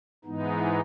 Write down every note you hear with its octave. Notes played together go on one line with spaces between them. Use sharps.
G#2 E3 G#3 B3 D#4